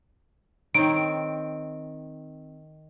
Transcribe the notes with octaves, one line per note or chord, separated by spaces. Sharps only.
D#3 C4 C#5 D7